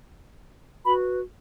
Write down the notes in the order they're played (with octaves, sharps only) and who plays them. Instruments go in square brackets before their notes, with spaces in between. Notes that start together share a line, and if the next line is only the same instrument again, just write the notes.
[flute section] F#4 B4 B5